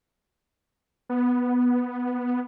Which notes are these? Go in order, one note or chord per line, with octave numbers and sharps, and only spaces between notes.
B3